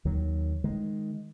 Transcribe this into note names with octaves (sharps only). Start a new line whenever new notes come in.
D#2 D#3 F#3
D#3 G#3